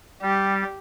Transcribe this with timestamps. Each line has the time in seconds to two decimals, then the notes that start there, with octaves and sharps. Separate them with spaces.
0.22 G3 G4